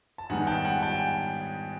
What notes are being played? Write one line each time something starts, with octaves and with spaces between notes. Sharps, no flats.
A5
G#2 D#3 G3 B3 F#5 G#5
G5 A5
F#5 G#5
G5 A5
G#5